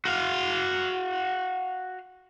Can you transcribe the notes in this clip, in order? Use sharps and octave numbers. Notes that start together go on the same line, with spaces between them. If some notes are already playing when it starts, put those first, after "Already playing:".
F#4 F5